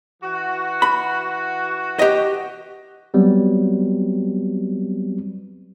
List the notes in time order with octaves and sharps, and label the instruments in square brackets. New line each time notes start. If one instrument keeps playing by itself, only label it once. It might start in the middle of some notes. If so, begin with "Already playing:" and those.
[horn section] E3 F#4
[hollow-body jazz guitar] B5
G4 D#5
[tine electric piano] F#3 G3 B3 C4